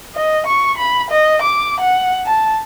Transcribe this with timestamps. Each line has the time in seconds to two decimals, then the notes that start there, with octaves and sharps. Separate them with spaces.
0.15 D#5
0.47 C#6
0.78 B5
1.10 D#5
1.42 D6
1.80 F#5
2.27 A5